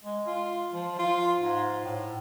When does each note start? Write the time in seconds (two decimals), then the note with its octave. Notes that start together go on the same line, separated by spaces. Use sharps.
0.04 G#3
0.27 F4
0.74 F3
0.98 F4
1.40 G#2
1.84 A2